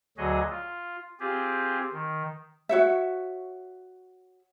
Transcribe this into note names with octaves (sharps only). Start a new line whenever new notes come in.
D2 D3 F#3 F#4 G#4 D#5
F4
C4 F4 G4 G#4
D#3
F#4 C#5 E5